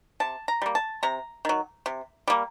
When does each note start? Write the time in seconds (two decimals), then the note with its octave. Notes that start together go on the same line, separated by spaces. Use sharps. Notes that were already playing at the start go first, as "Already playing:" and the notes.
0.20 C3 A5
0.48 A#5
0.62 G3 A#3
0.75 A5
1.03 C3 A#5
1.45 D#3 F#3
1.86 C3
2.28 G3 A#3